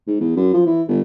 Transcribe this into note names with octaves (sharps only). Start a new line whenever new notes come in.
G#2
E2
F#2
F3
E3
G1